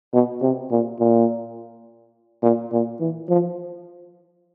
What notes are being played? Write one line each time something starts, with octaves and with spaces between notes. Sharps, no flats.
B2
C3
A#2
A#2
A#2
A#2
E3
F3